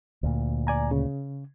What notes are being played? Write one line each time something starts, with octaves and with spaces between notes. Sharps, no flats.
D2 A#2
D5 G#5 A#5
C#3